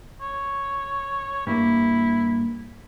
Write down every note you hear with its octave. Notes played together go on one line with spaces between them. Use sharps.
C#5
G2 A#3 E4